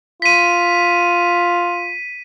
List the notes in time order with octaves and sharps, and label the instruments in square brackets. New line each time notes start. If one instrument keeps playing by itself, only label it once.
[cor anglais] F4 [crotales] B6 D#7